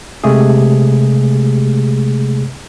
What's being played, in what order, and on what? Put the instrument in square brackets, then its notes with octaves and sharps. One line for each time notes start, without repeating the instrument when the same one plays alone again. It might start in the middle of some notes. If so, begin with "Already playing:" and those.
[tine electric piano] C3 G#3 A3 G4 G#4